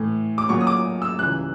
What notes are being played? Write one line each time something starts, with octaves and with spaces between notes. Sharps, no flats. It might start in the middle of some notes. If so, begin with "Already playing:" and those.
Already playing: A2 E3 A3
D6
A#2 F#3 A#3 C#6
D#6
D6
E6
C#2 C#3 E3 G3 F#6